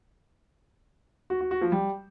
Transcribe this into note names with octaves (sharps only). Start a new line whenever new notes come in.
F#4
F#4
F#4
F3
G3